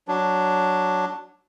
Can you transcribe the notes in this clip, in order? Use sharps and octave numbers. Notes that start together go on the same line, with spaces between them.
F#3 D4